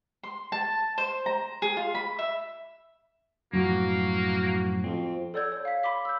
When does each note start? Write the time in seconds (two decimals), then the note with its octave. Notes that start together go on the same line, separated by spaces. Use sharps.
0.23 C6
0.52 A5
0.98 C5
1.26 A#5
1.62 G#4
1.77 F4
1.95 B5
2.19 E5
3.53 F#2 A2 F3 A#3 F#4
4.84 F2 C4
5.34 A4 C#5 D5 E6 G6 G#6
5.52 C#5
5.65 F5 B6
5.83 B5 C6 D6 B6
6.05 E6 G6